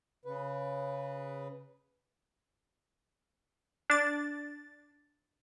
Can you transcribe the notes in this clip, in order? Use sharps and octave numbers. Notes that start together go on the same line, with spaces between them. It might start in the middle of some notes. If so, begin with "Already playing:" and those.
C#3 B4
D4 A6